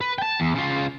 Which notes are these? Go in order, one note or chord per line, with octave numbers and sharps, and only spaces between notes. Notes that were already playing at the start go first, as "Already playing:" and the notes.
B4
G5 A5
E2
C#3 F4